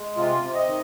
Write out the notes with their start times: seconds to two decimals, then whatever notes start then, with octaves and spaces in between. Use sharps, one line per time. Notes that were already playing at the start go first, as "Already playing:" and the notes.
Already playing: G#3
0.17 C3 F4
0.42 C3
0.55 D#5
0.67 D#3